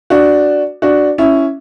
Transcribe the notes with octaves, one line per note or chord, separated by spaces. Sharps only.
D4 F#4
D4 F#4
C#4 E4